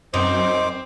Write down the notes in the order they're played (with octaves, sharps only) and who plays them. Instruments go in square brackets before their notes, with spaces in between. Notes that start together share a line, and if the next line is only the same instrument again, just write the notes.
[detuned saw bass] F#2 [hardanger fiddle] C4 [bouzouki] D#4 [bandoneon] C5 D6